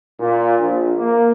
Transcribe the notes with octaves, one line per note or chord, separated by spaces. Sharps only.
A#2
A#1
A#3